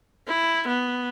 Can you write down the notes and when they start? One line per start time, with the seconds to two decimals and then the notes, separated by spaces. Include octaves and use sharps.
0.28 E4
0.68 B3